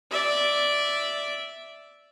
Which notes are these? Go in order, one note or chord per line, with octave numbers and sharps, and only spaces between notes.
D5 E5